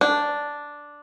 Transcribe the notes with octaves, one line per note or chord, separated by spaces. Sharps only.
D4